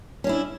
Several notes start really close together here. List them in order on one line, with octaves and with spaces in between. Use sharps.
C#4 D4 E4